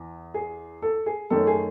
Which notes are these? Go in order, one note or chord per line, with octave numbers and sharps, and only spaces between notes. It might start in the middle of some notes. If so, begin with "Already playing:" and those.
Already playing: E2
G#4
A4
G#4
F#2 D#3 A3 C#4 A4
G#4